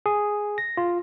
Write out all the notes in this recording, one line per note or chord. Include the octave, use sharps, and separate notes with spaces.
G#4
A#6
F4